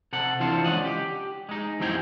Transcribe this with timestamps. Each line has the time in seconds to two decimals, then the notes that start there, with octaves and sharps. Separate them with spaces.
0.13 C3 A4 F#5
0.40 E3 D4 F4 A4 C5
0.64 C#2 C#4 D4 D#5 F#5
0.85 G4
1.49 G#3 D#4
1.80 F#2 E3 C4 G4 G5 G#5